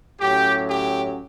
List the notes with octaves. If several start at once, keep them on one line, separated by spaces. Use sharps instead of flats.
A2 F#3 C#4 G4
G4